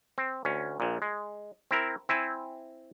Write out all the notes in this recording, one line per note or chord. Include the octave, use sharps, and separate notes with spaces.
C4
D2 C#4
A#1 A#2
G#3
C4 E4 A#4
C4 E4 G#5